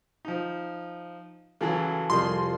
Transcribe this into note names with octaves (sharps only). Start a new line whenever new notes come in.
F3 D#4
C#3 E3 F#3 F#4 G#4 A4
C2 F2 G3 G#4 C6